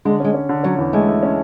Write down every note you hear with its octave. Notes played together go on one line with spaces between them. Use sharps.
D3 G#3
G#3 C#4
C#4
D3
F#3 C#4
E2
G#3 A3
A3
C#4